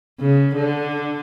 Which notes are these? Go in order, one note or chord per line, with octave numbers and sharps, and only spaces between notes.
C#3
D3